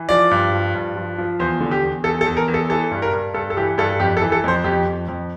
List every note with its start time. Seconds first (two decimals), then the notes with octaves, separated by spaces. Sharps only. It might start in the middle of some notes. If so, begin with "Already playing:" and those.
Already playing: E3
0.09 F3 D5
0.31 G2
0.53 F3
0.75 G2
0.96 F3
1.18 F3
1.40 E2 C5
1.60 D3
1.71 G4
1.83 E2
2.04 E2 A4
2.21 A4
2.26 E2
2.37 A#4
2.48 E2
2.54 A4
2.70 E3 A4
2.91 G2
3.02 A#4
3.13 G2
3.34 G2 A4
3.50 A4
3.57 E3 G4
3.78 G2 A4
4.00 F2 G4
4.17 A4
4.21 E3
4.32 A4
4.44 F2 C5
4.64 F2 G4
4.86 F2
5.08 F2